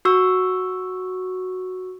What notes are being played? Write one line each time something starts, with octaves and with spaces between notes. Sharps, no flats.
F#4 C#6 E6